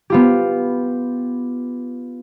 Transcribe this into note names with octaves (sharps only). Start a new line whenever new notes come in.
B3 F4 G4